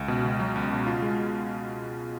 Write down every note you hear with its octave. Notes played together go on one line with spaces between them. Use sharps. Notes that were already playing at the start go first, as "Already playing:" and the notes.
Already playing: C#2
B2
C#2
F#3
C#2
B2
F4
G#3